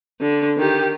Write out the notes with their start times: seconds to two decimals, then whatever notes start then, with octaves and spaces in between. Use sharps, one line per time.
0.21 D3
0.57 D#3 G4